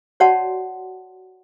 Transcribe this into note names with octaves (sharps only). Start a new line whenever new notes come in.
F#4 C#5 D5 F#5 A5 C6